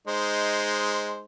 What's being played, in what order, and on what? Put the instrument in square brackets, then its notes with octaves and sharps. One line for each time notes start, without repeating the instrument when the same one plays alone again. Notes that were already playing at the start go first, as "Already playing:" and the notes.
[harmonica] G#3 D#4 C5